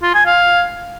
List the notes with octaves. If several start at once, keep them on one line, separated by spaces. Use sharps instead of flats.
F4
G#5
F5